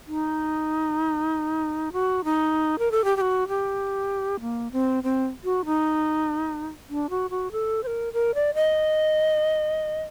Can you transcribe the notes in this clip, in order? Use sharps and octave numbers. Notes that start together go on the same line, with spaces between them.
D#4
F#4
D#4
A#4
A4
G4
G4
F#4
G4
A#3
C4
C4
F#4
D#4
D4
F#4
F#4
A4
C5
A#4
A#4
D5
D#5